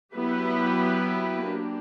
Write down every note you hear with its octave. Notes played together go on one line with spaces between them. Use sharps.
F#3 B3 E4 G4 B4
A#3 D4 G4